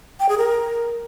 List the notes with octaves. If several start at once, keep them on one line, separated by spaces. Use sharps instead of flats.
G5
G#4
A#4